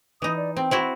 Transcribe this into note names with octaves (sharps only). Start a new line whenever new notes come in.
E3 D#4 D#6
D5
C4 G5
C4 E4 F#4